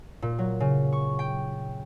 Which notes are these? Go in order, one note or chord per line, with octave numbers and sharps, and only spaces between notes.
A#2
F#3
C#3
C#6
G5